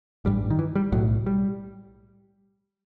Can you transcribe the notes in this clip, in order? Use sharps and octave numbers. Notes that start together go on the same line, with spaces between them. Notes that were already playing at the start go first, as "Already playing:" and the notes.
A1 G2 G3
D#3
E3
G3
B1 A2 F#3
G3